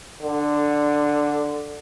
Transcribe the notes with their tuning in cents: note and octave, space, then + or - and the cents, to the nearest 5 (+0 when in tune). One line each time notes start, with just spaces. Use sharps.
D3 +5